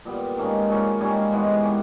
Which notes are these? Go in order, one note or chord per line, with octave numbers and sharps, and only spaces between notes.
A#2 G3 B3
G#2 D#3 A#3 C#4
A#2 A#3 C#4
G#2 G3 C#4 G#4
E3 G#3 B3
A#3 C#4 G4